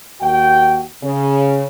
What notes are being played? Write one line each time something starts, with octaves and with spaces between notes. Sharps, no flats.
D#2 F#4 G5
C#3